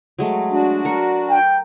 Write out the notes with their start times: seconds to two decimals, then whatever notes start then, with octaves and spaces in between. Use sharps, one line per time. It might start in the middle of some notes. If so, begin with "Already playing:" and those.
0.18 F#3 G#3 A3
0.51 D4 F#4
0.85 A#4 C#6
1.30 G5